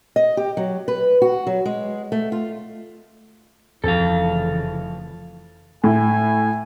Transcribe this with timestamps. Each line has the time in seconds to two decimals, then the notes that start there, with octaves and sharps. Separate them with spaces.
0.16 D#5
0.37 G4
0.57 F#3
0.88 B4
1.22 F#4
1.47 F#3
1.66 G#3
2.12 A3
2.32 F4
3.84 F1 F2 C#3 E3 A4 F5
5.84 A2 G#5